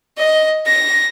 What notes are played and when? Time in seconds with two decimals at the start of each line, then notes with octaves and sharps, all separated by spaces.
0.17 D#5
0.66 A#6